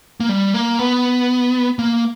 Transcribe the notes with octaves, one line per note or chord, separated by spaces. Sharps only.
A#3
G3
A#3
B3
A#3